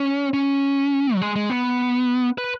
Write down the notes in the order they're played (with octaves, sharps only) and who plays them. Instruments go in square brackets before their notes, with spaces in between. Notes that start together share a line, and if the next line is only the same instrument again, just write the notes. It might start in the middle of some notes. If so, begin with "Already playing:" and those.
Already playing: [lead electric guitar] C#4
C#4
F#3
G#3
G#3
B3
B4